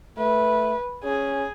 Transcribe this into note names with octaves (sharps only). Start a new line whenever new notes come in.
A3 B4
C#4 G#4